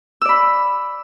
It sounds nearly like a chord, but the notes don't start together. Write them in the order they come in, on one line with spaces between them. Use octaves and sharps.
E6 D5 B5